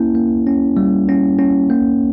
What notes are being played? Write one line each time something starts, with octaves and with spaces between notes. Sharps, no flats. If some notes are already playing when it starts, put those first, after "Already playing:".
Already playing: A#3 C#4 E4
A#3
C#4
G3
C#4
C#4
A#3